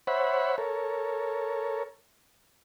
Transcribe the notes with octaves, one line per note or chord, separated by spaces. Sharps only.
C5 C#5 E5 F#5 B5
A4 A#4 C#5